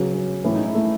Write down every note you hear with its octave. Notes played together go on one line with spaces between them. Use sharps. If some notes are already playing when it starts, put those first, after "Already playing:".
Already playing: C#3 F#3 B3
C#4
A2 E3 C#4
D#4
E4
A3